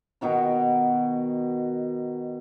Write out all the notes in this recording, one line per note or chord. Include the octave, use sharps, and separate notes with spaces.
B2 D#3 F#4 A#5